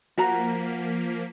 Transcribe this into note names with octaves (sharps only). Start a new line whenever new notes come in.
F3 A#3 F#4 F#5 A#5 B6